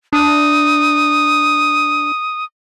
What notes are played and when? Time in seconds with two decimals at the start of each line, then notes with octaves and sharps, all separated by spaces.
0.13 D4 D#6